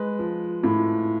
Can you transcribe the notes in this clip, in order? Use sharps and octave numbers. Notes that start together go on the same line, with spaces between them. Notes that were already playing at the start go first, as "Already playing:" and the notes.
Already playing: G#3 B4
F3
A2